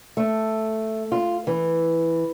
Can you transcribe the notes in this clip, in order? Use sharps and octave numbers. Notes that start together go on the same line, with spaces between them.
A3
F4
E3